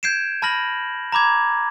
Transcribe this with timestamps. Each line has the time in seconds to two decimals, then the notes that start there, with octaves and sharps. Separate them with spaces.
0.03 G6 G#6 C7 D7 E7
0.42 A5 B5 F6 A#6 F#7
1.12 A#5 B5 D6 G#6